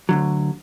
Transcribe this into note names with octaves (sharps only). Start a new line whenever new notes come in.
D2 D3 F#3